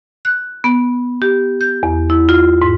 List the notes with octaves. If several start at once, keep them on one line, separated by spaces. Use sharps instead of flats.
F#6
B3
G4
G6
E2
E4
F4
G#2